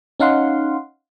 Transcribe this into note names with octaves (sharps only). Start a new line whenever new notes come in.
C#4 D#4 F5 F#5 C6